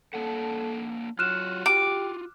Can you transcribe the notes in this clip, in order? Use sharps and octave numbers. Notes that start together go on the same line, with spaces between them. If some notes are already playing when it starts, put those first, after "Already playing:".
A#3 D4 A4 F#5
F#3 F4 F#4 F6 F#6 E7
G4 D6